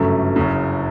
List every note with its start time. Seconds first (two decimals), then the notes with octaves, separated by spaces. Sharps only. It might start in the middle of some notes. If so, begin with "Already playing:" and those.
Already playing: G1 F#2 C#3 F#3 A3
0.36 F#1 F#2 C#3